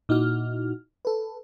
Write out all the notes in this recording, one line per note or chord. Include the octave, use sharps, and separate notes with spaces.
A#2 D#4 E4 F#4 F6
A4 B4